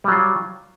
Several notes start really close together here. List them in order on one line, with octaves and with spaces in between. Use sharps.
G3 F#3 F4